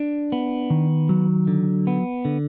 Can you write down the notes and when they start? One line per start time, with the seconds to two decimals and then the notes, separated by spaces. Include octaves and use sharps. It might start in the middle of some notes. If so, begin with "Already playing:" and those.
Already playing: D4
0.32 B3
0.70 D#3
1.09 F#3
1.47 D3
1.87 B3
2.25 D3